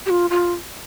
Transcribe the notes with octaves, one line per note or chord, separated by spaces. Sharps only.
G4
F4
F4